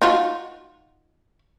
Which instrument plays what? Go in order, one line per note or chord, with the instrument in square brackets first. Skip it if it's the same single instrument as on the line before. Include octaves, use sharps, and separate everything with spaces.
[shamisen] D#4 F4 F#4